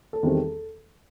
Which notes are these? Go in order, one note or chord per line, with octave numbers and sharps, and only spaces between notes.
A4
E2 D#3 G3 C4